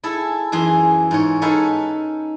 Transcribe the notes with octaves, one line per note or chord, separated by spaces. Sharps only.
E4 G#4 A4
F#2 E3 G#4 C6
G#2 C#4 C#5
D#4 A4 B4 F5 F#5 G#5